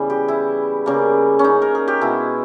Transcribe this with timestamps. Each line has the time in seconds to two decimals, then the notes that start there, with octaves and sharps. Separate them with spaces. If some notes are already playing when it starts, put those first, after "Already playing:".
Already playing: C#3 E3 G3 B3
0.10 G4
0.28 E4
0.86 C#3 G3 A#3
1.39 C#4
1.44 D#4
1.62 A#4
1.75 G#4
1.88 G4
2.01 B2 G#3 B3 E4